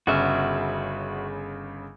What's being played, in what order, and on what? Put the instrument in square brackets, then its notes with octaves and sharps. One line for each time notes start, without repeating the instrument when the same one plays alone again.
[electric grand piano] G1 C#3 G#4 [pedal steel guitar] F#4 E5 F6